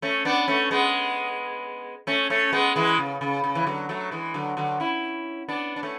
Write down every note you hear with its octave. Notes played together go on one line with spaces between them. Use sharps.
A3 C#4
B3 D4
A3 C#4
G#3 B3
A3 C#4
A3 C#4
G#3 B3
E3 G#3
C#3
C#3
C#3
E3
D3 F#3
F#3 A3
E3 G#3
D3 F#3
D3 F#3
C#4 E4
B3 D4
D4
A3 C#4